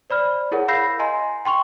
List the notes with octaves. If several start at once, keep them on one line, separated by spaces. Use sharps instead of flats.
C5 D5 B5 F6
E4 G#4 A#4 C#5 F#5
F5 B5 E6 G6 A#6 C7
D#5 G#5 A#5 C6
G5 C6 C#6 F7